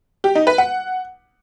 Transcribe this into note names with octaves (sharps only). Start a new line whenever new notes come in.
G4
D#4
B4
F#5